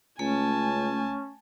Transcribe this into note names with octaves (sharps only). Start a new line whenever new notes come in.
C#2 A3 C#4 G#5 A5